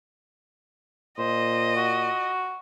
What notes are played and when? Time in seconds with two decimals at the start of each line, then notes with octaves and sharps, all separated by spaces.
1.19 A#2 C5 D#5
1.76 F#4